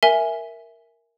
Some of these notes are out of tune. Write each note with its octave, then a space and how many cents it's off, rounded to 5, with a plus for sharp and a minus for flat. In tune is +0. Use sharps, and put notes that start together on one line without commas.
A#4 +0 E5 +0 G#5 +0